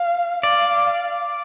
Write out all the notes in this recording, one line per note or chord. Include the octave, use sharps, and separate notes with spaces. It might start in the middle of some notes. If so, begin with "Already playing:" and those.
Already playing: F5
D5 F5